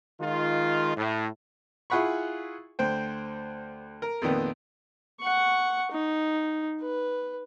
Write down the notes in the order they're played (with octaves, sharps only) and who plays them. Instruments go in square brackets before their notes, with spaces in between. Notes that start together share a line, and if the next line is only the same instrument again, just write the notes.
[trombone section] D#3 G#3 F4
A2
[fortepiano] E4 F4 G#4 F#5 B5 C#6
D2 C5 G5
A#4
F2 A#2 D#3 B3
[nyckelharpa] F#5 C#6
D#4
B4